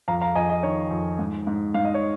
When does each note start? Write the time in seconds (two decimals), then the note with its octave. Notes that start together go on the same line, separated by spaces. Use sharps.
0.08 F2 F5 A#5
0.21 F5 A#5
0.35 F2 D#5 G#5
0.49 D#5
0.63 D#3 C#5
0.91 F2
1.19 G#2
1.47 G#2
1.74 G#2 F5
1.85 D#5
1.94 C#5